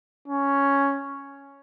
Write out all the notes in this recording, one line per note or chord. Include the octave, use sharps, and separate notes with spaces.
C#4